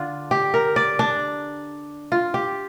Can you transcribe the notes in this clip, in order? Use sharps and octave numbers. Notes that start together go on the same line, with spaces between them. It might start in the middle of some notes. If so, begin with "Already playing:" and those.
Already playing: D3 D4 F4
G4
A#4
D5
D4
F4
G4